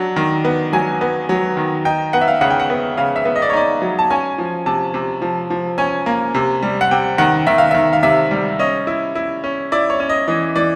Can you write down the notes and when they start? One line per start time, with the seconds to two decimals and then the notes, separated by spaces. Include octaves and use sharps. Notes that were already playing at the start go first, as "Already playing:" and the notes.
Already playing: F#3 D4
0.16 D#3
0.45 B3
0.73 F#3 G#5
1.01 B3
1.29 F#3
1.57 D#3
1.85 D#4 G5
2.13 B3 F#5
2.21 E5
2.28 F5
2.41 C#3 F#5
2.50 G5
2.60 F#5
2.70 B3
2.97 C#3 F5
3.16 E5
3.25 B3
3.36 D#5
3.42 D5
3.50 C#5
3.53 D#4 D5
3.82 F#3
3.99 A5
4.11 C#4 G#5
4.38 F3
4.66 C3 A5
4.94 C3
5.22 F3
5.50 F3
5.78 C#4 G#5
6.06 A#3
6.35 C3
6.63 G3
6.81 F#5
6.91 C3 G5
7.18 D#3 F#5
7.47 D#3 E5
7.58 F5
7.71 D#3 E5
7.93 F5
8.03 C3 E5
8.31 G3
8.59 C#4 D#5
8.87 E4
9.15 E4
9.44 C#4
9.72 E4 D5
9.90 C#5
10.00 C#4
10.09 D#5
10.28 E3 D#5
10.55 E3 D5